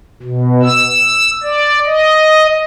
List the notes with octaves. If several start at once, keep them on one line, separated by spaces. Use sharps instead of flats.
B2
E6
D5
D#5